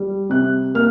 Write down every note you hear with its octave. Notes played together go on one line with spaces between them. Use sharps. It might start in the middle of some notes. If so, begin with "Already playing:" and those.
Already playing: G3
C3 F#6
A#3 F6